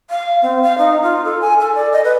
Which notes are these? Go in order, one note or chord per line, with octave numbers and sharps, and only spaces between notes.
F5
C4
F5
D#4
F4
A4
G#5
A4
D5
D#5
B4